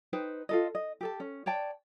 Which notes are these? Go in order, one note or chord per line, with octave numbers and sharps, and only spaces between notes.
D#4 B4 C5 G5
F4 A4 D#5
D#5
G4 A4 A5
C#4
C#5 D5 G5 A5